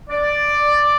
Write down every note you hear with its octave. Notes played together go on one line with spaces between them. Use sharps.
D5